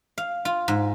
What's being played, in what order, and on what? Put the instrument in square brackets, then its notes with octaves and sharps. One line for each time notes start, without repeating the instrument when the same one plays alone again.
[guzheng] F5
F4
G#2